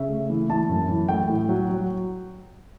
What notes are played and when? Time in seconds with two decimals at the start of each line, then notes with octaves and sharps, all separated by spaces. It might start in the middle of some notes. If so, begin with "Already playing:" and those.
Already playing: C#3 E5
0.09 A3
0.30 E3
0.50 E3 A5
0.69 F#2
0.89 E3
1.09 A3 G5
1.29 A2
1.49 F#3
1.70 F#3